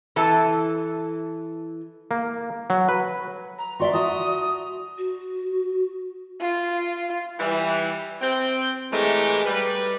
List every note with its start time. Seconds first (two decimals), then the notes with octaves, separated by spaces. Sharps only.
0.16 E3 A4 A5
2.11 A#3
2.70 F#3
2.89 B4
3.58 A#5
3.80 F#4 D5 E5 C6
3.93 F#4 A5 A#5 D#6
4.98 F#4
6.40 F4
7.39 E3 G3
8.21 C4 G5
8.92 A2 E3 G#3 A3 G4 A#4
9.46 G3 B4